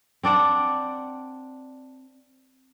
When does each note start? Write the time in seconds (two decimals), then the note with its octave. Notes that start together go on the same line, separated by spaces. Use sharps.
0.23 C4 D4 D5 F#5